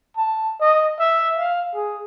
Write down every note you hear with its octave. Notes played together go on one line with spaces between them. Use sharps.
A5
D#5
E5
F5
G#4